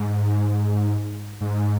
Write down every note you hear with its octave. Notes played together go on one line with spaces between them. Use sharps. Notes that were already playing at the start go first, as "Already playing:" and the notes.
Already playing: G#2
G#2